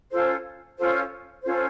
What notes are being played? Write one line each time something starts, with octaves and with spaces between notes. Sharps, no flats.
C#4 F4 A4 C5
C#4 F4 A4 C5
C#4 F4 A4 C5